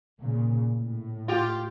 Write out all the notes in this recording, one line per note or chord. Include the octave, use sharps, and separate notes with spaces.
A#2 C#3
A2
F4 G4